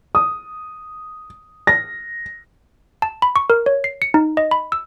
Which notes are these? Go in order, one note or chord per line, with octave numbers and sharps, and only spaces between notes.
D#6
A#6
A5
B5
C#6
A#4
C#5
C7
C#7
D#4
D#5
B5
E6